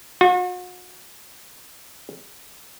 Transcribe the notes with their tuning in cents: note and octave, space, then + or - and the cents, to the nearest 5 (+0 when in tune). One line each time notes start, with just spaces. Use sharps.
F#4 -40